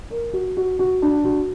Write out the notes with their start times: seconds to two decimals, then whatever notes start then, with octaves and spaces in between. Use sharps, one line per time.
0.10 A#4
0.33 F#4
0.57 F#4
0.79 F#4
1.02 D4
1.25 F#4